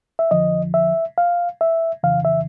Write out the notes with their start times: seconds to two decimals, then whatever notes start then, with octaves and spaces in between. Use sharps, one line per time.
0.19 E5
0.31 F2 D3 F3 D#5
0.74 E5
1.18 F5
1.61 E5
2.03 F2 C#3 E3 F5
2.25 E5